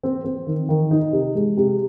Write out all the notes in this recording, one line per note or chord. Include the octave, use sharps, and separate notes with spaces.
C4
C4
D#3
D#3
D#4
C3
G#3
C3